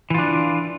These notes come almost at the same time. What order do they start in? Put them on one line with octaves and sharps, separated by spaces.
E3 F4 D4